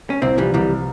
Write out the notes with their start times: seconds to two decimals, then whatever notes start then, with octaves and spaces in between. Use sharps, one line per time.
0.10 C#4
0.22 C2 C4 E4
0.38 E3 F3 G3
0.54 C2 E3 G3